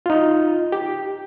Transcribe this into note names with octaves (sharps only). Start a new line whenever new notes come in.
D#4 F4
G4